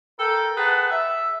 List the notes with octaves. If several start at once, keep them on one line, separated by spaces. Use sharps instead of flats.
A4 A#4 G5
G#4 B4 F#5 G5 A5 A#5
E5